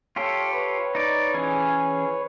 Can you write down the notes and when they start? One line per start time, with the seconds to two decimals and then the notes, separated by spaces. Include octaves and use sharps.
0.16 F4 G4 A4 C#5
0.52 B4 C#5
0.95 D#4 D5
1.34 E3 C#4 G#4